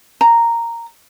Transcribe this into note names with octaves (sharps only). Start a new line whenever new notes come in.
A#5